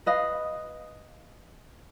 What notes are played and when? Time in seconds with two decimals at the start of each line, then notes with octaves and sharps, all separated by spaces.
0.06 B4 D#5 F5